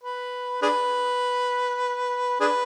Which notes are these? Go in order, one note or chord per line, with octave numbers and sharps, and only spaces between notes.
B4
D4 G#4 B4
D4 G#4 B4